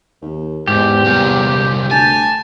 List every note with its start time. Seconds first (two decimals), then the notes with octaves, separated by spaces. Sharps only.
0.21 D#2
0.68 E2 G#2 G4
1.05 C2 A#2
1.91 D2 G#5 A5